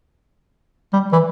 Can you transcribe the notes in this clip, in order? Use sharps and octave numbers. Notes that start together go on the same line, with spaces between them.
G3
E3